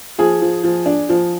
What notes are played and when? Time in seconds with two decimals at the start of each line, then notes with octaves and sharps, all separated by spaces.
0.18 F3 G#4
0.42 F3
0.64 F3
0.86 D4
1.09 F3